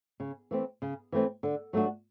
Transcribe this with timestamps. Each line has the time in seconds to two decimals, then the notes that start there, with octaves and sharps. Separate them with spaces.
0.20 C#3
0.51 E3 A3 C4
0.82 C#3
1.12 E3 A3 C4
1.43 D3
1.73 F#3 A3 D4 F#4